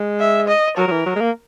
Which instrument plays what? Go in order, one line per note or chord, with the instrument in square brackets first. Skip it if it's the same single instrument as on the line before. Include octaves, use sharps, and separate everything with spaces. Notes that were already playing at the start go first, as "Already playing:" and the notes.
Already playing: [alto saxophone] G#3
[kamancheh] E5
D#5
[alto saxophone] F#3 [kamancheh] A#4
[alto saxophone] F#3
E3
F#3
G#3
A#3